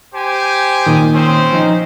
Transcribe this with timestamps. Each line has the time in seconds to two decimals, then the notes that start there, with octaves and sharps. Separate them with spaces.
0.15 G4 C5 G#5
0.85 A#2 D#3 D#6
1.14 C4 C#4 C5
1.52 F3 D#4